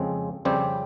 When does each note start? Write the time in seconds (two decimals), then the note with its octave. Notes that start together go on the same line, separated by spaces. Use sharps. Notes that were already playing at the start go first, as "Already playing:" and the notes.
Already playing: F2 C#3 F3 G#3 C4
0.45 F2 C#3 G3 C4 G4